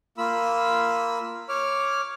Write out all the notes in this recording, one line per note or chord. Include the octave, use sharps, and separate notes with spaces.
A#3 F4 B5 E6
C#5 D6 F6